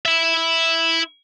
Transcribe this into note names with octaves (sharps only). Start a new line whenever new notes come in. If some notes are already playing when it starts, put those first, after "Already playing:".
E4 E5